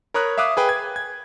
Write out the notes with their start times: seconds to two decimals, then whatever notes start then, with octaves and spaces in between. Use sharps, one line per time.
0.14 A#4 C#5 A#5 B5 D#6 F#6
0.38 E5 F5 D6 D#6 F#6
0.57 G#4 B4 G5
0.69 G#6
0.96 G#6